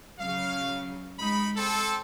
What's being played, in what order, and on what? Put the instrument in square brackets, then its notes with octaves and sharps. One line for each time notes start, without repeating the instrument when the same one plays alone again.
[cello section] C#3 F#3 [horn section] F5
[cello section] G#3 [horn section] D#4 B5
[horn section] C4 A4